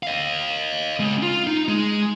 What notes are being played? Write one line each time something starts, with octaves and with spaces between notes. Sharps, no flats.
D#5 F5
C#3 G#3
F4
D#4
G#3